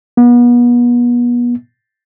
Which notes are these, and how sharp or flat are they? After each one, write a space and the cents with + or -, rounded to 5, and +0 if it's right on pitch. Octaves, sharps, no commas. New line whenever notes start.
B3 -35